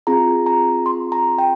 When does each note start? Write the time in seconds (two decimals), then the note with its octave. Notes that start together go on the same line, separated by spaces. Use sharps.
0.07 C4 F4 G#4 A#5
0.46 A#5
0.86 C6
1.12 A#5
1.38 G5